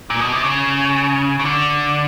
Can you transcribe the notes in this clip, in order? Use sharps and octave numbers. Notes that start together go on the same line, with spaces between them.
A#2
B2
C3
C#3
C#3
D3